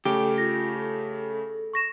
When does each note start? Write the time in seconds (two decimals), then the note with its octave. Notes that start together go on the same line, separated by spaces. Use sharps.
0.05 C#3 A3 G4 A4 D7
0.38 F4 A#6
0.78 A4
1.73 C#6 A#6 E7